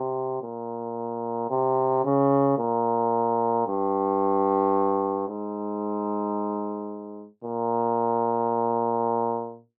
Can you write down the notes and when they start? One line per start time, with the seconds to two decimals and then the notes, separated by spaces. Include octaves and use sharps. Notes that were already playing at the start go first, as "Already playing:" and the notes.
Already playing: C3
0.42 A#2
1.50 C3
2.04 C#3
2.58 A#2
3.67 G2
5.28 G#2
7.44 A#2